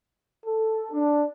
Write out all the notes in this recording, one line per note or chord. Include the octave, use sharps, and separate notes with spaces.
A4
D4